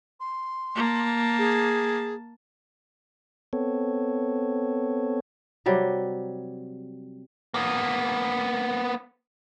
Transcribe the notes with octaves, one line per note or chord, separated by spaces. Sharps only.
C6
A#3 A5
G#4
B3 C4 A4 C#5
C3 F#3 G3
A#3 B3